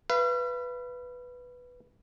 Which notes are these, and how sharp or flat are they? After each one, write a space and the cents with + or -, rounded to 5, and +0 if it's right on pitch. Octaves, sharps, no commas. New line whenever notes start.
B4 +0 F5 -45